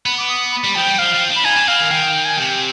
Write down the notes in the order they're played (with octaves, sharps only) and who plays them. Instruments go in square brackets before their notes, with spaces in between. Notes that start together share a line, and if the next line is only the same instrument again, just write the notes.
[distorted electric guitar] B3 [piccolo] B5
[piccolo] D6
D#6
B5
[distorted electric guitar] G3
[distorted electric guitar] F3 [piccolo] G5
[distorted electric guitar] G3
[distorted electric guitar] F3 [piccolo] F5
[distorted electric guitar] F3
D4
[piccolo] B5
[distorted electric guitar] D#4 [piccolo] G#5
[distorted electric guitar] D4
[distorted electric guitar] C4 [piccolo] F5
[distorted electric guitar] D#3
[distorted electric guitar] D#3 [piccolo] G5
[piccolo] G#5
[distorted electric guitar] C3 [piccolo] G5